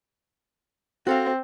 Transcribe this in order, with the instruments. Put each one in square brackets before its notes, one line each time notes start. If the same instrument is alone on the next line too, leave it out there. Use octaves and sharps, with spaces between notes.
[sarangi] C4 [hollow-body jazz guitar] F#4 A4 F5